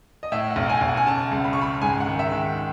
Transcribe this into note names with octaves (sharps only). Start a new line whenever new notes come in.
D#5
A2 E5
F#5
B1
G#5
B1
F#5
G#5
C#3 A5
C#2
B5
C#3 C#6
B5
G#2 G#5
F#5
D#3
E5
D#3